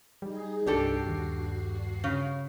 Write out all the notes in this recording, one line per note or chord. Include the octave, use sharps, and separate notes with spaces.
G3 D#4 G#4
C2 G2 D4 F#4 G4 A4 C7
D#2
C#3